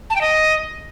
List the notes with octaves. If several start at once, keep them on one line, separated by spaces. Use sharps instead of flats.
A5
G5
D#5